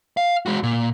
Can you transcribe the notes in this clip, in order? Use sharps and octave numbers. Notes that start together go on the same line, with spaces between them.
F5
G#3 F#4
A#2